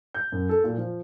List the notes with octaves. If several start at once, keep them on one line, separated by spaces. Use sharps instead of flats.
G6
F#2
A4
A#2
F3